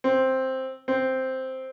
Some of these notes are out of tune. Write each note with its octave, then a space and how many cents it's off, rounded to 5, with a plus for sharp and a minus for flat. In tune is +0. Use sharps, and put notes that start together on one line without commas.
C4 +5
C4 +0